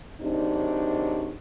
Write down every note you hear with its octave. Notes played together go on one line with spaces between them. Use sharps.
G#2 C3 D#3 F#3 D4 D#4